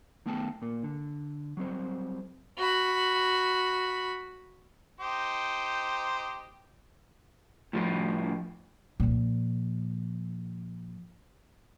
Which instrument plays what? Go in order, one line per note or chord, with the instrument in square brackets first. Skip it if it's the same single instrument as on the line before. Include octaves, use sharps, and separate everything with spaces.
[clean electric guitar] D#3 A3 B3 G5 A5
A#2 A#3
D3
F#3 G3 C4 C5
[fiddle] F#4 B5
[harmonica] D#4 G4 C5
[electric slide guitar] A2 F3 G3
[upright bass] A#2 F3